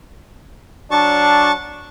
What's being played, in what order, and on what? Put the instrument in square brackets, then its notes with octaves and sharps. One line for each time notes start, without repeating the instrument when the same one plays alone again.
[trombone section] F#3 D4 [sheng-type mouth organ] A5 C#6